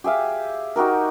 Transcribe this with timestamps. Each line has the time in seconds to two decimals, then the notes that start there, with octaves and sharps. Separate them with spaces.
0.04 G4 G#4 E5 F5
0.76 D#4 F#4 G4 A#4